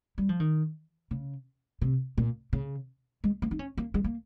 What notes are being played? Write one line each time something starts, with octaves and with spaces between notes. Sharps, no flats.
G3
F3
D#3
C#3
C3
A#2
C#3
G#3
A#3
D#4
C#4
A#3
G#3
A#3